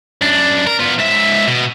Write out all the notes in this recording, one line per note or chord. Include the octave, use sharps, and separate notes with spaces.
F#2 D4
A#4
B3 F4
G#2 E5
B2